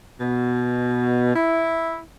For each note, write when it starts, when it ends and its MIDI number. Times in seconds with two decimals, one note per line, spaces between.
0.20 1.33 47
1.34 1.98 64